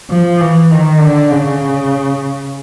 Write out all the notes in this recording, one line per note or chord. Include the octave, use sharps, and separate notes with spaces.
F3
E3
D#3
D3
C#3